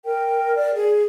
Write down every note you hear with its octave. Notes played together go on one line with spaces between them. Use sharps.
A#4 G5
D5
G#4